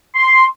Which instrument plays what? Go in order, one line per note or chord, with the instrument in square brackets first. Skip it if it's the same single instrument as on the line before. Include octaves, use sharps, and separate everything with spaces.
[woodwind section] C6